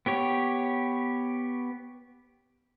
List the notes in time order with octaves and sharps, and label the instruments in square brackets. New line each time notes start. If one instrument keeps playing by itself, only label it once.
[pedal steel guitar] B3 G4 C#5